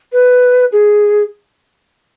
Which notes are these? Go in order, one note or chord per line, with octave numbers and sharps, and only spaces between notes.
B4
G#4